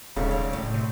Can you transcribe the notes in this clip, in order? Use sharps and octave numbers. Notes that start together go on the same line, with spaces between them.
D#1 G#1 C#3 A4 D5 E5
C#5 D5
A2
C3